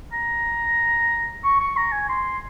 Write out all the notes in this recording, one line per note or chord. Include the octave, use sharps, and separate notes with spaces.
A#5
C#6
C#6
A#5
G#5
C6